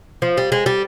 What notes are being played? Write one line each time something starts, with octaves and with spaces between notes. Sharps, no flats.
F3
G3
G#3
G3